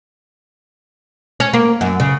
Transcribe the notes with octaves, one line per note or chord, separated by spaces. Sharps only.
C#4
A#3
F#2
C#3